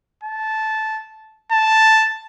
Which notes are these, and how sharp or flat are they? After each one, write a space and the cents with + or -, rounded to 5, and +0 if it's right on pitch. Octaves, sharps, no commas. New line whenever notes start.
A5 -10
A5 +0